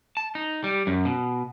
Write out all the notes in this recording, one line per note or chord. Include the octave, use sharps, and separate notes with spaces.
A5
D#4
G3
F#2
B2